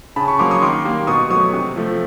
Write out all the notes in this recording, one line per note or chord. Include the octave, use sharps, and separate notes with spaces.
C#3 A5 B5
B5 C#6
F#3 A#3 C6 D6
C#6 D#6
D#3 C6 D6
G3 A#3
B2 C#6 D#6
F#3 A3 C#6 D#6
C3
F3 A3